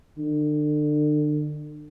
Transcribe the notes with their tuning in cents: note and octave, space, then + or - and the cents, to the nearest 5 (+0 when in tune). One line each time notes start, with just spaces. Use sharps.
D3 +35